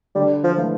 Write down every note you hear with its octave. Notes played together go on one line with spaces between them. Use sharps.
D3 G3
F3
F3 A3 E4 B4